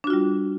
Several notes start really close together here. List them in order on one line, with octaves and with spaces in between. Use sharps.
D4 F#4 F4 G3